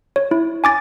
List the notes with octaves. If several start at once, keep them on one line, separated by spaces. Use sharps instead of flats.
C#5
E4
G#5 D6 A6